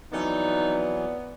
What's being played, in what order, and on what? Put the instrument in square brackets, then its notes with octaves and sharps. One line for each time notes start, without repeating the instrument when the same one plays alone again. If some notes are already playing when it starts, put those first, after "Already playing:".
[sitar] F2 A4 D5 [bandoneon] E3 F#3 [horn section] B3 [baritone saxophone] D#4